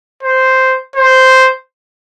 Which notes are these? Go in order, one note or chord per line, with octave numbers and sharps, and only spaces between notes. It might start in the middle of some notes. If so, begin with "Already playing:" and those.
C5
C5